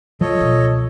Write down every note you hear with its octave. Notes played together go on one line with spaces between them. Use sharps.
F3 A4 C#5 D#5
C#2 B2